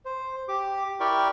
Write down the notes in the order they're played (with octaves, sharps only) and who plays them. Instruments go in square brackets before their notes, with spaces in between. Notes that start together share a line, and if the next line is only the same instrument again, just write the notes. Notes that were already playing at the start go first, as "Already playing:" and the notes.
[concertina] C5
G4 D6
E4 G4 A#4 D5 G5 C#6